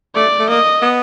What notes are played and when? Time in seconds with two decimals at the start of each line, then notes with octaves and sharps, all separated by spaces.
0.15 A3 D5
0.39 A3
0.49 A#3 D#5
0.82 B3